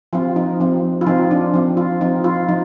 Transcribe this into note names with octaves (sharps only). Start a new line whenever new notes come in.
F3 C4 F4
D#4
F3 C4
F4
F3 C4 D#4
D4
F3 C4
F4
F3 C4 D#4
F4
F3 D#4